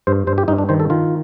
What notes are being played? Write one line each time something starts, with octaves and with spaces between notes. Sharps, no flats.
G2 C5
G2 C5
G4
G2 D#4
D4
D#3 C5
A4
D#3 F4